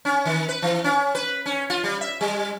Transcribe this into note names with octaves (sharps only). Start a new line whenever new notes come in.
C#4
D#3
B4
E3
C#4
B4
C#4
F4
G3
E5
G3